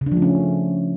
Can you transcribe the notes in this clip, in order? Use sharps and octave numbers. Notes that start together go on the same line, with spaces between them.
C#3
D4
F3
A3
C#4